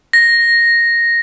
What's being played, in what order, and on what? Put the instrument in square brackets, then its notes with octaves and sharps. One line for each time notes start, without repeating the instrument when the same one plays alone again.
[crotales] A#6